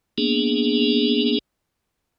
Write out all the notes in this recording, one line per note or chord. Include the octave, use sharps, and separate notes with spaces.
A#3 B3 D4 G#4